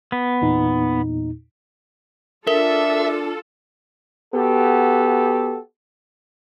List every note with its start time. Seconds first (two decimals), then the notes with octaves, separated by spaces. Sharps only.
0.12 B3
0.42 E2 A#2 D#4
2.47 D4 F4 A4 A#4 E5
4.34 B3 F#4 G4 A4